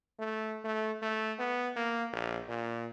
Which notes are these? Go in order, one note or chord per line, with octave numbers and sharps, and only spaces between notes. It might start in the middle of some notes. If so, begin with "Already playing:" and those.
A3
A3
A3
B3
A#3
A#1
A#2